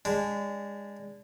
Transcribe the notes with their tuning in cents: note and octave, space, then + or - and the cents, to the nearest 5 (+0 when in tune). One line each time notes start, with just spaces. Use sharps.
G#3 -30 D4 -20